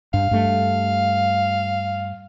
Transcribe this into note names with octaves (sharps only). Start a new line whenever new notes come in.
G2 F5
G2 A3